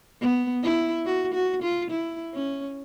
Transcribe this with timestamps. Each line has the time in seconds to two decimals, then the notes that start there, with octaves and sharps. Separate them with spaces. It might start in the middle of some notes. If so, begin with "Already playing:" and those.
0.21 B3
0.63 E4
1.05 F#4
1.34 F#4
1.62 F4
1.90 E4
2.33 C#4